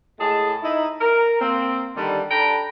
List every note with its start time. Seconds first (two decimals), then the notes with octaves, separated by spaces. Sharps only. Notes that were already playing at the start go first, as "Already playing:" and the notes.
0.20 A2 G#3 G#4 A5
0.62 D#4 E4
1.01 A#4
1.41 A#3 C4
1.96 D3 D#3 G3
2.31 D4 A4 G5 A#5 B5